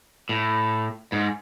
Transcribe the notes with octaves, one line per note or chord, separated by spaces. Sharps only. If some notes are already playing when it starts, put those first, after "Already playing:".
A2
G#2